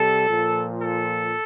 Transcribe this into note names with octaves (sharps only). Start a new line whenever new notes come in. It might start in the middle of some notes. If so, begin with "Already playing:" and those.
Already playing: C3 G3 A4
A#2 F3
A4